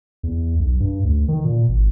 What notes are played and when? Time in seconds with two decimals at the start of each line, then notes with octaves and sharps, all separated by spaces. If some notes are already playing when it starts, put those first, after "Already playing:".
0.23 E2
0.59 B1
0.80 G2
1.04 D2
1.28 D#3
1.44 A#2
1.69 G#1